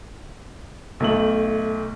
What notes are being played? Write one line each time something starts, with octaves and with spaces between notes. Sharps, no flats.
B1 A3 F#7